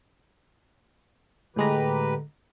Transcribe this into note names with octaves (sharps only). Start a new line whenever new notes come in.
A2 D3 G#3 G4 B4 A#5